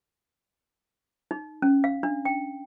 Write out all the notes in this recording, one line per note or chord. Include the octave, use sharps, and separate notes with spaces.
D#4
C#4
F5
D4
G5